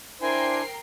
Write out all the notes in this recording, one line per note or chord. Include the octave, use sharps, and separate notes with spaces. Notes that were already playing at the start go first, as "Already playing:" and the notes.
D4 E4 A#4 C5 G5 G#5 C7